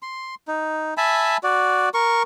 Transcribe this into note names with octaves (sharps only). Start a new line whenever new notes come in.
C6
D#4
E5 G#5 A5 B5
F#4 D5
A#4 C#6